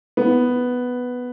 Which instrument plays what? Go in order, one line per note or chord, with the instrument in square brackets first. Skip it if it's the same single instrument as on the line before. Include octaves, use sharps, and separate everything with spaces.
[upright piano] B3